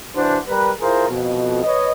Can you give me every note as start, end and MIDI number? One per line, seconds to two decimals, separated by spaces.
0.15 0.37 52
0.15 0.37 62
0.15 0.37 66
0.15 0.37 72
0.48 0.70 55
0.48 0.70 70
0.48 0.70 71
0.80 1.06 64
0.80 1.06 65
0.80 1.06 68
0.80 1.06 70
0.80 1.06 72
1.09 1.61 41
1.09 1.61 47
1.63 1.92 71
1.63 1.92 73
1.63 1.92 75